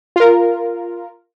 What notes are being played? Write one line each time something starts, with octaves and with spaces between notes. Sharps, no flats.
F4 A#4